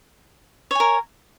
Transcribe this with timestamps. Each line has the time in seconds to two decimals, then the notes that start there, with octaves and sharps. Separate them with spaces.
0.71 C#5
0.75 G#5
0.80 A#4